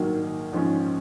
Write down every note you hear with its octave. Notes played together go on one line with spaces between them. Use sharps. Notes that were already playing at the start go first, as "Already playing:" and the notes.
Already playing: A#1 G#2 D#3 F#3 A#3
A#1 G#2 F3 G#3 C#4